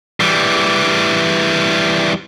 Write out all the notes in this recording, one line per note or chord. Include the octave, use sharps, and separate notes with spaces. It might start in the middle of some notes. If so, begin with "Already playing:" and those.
E3 G3